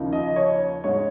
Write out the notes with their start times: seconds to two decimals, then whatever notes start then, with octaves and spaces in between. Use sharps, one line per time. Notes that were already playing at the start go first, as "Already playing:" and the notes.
Already playing: D#2 C#3 F3 A#3 D#4
0.13 D#5
0.36 C#5
0.84 G#2 G#3 C#5